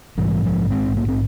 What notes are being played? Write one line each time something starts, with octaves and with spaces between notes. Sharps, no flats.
A#1 G#2 E3 G3
F3 G#3
G#3 C4
A#3
C4